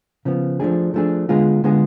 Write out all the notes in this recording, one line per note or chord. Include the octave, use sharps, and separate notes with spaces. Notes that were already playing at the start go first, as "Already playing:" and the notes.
C#3 F3 B3
F3 A3 D4 G#4
F3 A3 D4 G#4
D3 G#3 B3 F4 G#4
D3 G#3 B3 F4 G#4